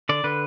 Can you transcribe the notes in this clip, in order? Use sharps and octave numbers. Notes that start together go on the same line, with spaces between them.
D3 D5
D3 B4